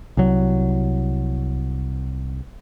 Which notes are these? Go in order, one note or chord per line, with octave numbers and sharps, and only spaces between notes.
C2 F#3